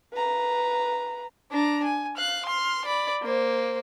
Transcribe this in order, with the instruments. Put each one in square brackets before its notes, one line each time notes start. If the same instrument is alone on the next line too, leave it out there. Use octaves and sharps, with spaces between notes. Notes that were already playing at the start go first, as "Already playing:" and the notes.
[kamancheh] B4 A#5
[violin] D4 A#5
G#5
F5 F#6
C6 F6
D5 B5
A#3 C5